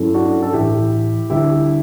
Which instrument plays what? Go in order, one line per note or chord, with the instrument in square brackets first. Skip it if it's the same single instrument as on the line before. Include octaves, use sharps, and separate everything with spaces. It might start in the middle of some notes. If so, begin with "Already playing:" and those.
Already playing: [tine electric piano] G2 F#3 C#4 E4 A4
[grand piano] D4 F#4
A4
[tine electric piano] B1 A2 E3 [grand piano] E4 G4
[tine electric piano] D2 D3 G3 D4 [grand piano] E4 G4